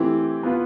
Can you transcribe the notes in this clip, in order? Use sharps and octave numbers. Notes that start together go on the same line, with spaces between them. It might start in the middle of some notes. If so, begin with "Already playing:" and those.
Already playing: E3 A3 C4 E4 G4
B3 F4 B4